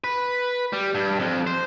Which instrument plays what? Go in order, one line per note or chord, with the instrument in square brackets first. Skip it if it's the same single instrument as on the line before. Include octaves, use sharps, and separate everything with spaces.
[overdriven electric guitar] B4
G3
G2
F2
C5